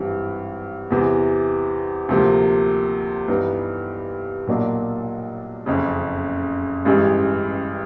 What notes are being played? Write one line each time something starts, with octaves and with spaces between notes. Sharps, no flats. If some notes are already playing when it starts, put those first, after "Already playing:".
Already playing: G#1 G2 E3
E2 C3 E3
D2 C3 F3 A#3
G2 E3 G3 B3 D#4
B1 A#2 F#3 A#3 D4
F#1 F2 C#3
A1 G2 E3 G#3